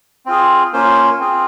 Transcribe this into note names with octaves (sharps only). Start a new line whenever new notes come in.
C4 F4 G#4
A#3 C#4 F4 C5
C4 F4 G#4